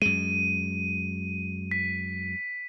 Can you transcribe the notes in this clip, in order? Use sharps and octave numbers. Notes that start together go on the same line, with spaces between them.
F#2 G#3 D#7
B6